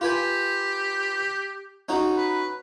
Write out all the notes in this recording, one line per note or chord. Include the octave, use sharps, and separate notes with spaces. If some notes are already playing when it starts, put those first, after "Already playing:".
F4 G4 B4 G#5
C#4 D#4 F#4
B4